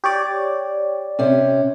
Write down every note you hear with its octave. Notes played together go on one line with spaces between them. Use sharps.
G4 C#5 D5
C3 C#4